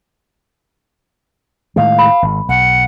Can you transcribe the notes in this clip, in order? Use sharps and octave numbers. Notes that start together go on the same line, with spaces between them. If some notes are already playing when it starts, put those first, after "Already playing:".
A2 D#3 G#3 F5
B5
G#1
B1 F#5